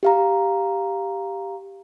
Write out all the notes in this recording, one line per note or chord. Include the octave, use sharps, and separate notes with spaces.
G4 F5 A#5